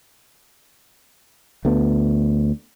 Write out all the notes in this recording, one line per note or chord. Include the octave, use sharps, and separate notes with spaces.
D2 A3 B3